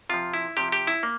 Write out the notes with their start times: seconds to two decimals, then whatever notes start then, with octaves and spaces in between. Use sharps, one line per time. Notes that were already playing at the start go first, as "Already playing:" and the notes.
0.09 C3 F3 F4
0.34 E4
0.57 C3 F3 G4
0.72 G4
0.87 E4
1.03 A#3